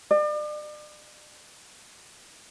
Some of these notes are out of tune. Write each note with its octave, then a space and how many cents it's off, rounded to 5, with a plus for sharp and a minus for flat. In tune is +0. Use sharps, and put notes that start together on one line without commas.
D5 +40